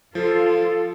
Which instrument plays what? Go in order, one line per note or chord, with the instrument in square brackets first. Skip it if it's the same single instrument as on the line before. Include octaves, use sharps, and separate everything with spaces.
[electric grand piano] F3 [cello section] F4 [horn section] A4